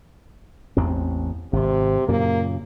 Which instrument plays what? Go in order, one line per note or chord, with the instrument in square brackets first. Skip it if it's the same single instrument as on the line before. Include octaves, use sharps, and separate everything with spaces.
[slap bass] A1 E2 C4
[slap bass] G#1 [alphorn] C3
[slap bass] F#2 A#2 C#3 [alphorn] A#3